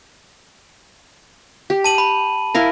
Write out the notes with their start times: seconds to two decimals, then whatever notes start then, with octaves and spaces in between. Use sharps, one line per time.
1.70 G4
1.84 A5 D#7 F#7
1.98 B5
2.55 E4 A#4 F5